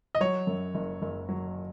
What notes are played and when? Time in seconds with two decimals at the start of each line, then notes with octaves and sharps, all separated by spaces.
0.15 D#5
0.20 F#3 C#5
0.47 F#2
0.74 F#1
1.02 F#1
1.29 F#3